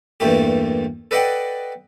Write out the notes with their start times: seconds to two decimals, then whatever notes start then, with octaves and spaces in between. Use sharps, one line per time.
0.20 E2 G2 A#2 A3 G4
1.11 A4 B4 D5 D#5 F#5 G5